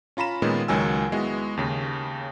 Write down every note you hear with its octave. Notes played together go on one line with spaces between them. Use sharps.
C#4 F4 A#5 B5 E7
A#2 D#3 G#3 B3 C#4
C#2 D#3 F#3 G#5 E6
G#3 B3 E4 F#4
D#2 C#3